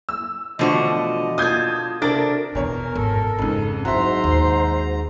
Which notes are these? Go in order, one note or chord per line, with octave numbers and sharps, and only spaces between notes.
E6
B2 D3 E3 F3 A3 F#4 D#5
F4 A4 D#6 G6 G#6
C3 D4 F#4 A4 A#4 A6
E2 B2 A#4 C#5
G#1 A4
F2 G#2 C#3 C#4
G#2 F#3 E4 F#4 C5 E5 A#5 C6
D#2